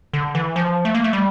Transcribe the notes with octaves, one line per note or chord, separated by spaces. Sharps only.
D3
E3
F3
A3
A#3
A3
G3